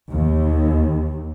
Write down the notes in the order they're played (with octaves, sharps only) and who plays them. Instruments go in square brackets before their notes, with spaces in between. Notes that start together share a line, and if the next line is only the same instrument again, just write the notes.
[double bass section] D#2